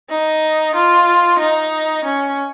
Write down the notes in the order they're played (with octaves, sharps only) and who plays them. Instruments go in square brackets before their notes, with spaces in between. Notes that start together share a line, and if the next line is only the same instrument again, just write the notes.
[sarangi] D#4
F4
D#4
C#4